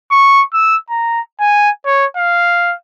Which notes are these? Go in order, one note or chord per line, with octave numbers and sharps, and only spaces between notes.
C#6
E6
A#5
G#5
C#5
F5